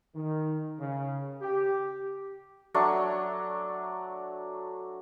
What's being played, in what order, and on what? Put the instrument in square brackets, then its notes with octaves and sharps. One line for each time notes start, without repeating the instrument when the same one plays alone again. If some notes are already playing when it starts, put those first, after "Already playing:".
[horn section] D#3
C#3
G4
[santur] F#3 A3 D4 C#6